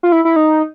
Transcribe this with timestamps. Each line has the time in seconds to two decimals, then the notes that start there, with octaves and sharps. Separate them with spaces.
0.03 F4
0.12 E4
0.25 E4
0.36 D#4